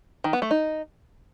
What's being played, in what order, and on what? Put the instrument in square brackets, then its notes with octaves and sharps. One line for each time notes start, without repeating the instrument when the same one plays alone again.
[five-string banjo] D#3
B3
A3
D#4